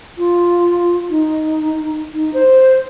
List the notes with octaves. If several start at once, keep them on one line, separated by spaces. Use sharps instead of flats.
F4
D#4
D#4
C5